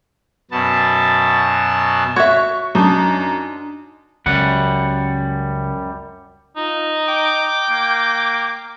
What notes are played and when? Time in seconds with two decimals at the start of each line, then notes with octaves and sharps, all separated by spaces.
0.51 F#2 B2 B3 A5
2.16 F#4 C#5 E5 C#6
2.75 F#2 D4 D#4
4.26 C#2 F#2 G3 F#5
6.57 D#4 F4
7.08 G5 D6
7.70 A#3